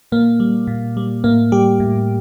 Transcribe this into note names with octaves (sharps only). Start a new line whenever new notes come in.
A#2 A#3
G3
A#2
G3
A2 A#3
G3 G4
A2